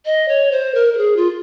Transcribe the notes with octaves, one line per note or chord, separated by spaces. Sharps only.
D#5
C#5
C5
A#4
A#4
G#4
F4